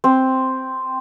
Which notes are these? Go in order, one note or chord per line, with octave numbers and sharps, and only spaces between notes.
C4